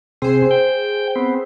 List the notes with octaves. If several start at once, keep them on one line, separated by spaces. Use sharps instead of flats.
C3 C4 G#4 C5
G5
B3 C4